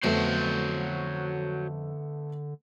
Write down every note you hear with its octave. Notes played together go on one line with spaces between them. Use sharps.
F2 D3 F#3 A3 B3 C5